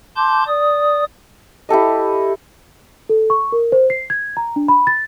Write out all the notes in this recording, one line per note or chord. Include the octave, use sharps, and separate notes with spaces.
A5 C6 D6 G6
D5 D#6
E4 G4 A4 D#5
A4
C#6
A#4
C5
C7
G#6
A#5
D4
B5
A6